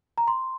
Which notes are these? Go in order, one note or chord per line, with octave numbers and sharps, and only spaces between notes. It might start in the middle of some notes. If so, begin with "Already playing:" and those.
A#5
C6